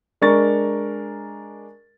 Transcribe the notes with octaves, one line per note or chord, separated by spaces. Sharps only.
G#3 D4 A#4 A#5 C#6 A6